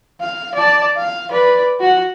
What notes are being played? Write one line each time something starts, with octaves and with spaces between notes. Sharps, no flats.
F5
D5 A5
F5
B4 D5
F#4 F#5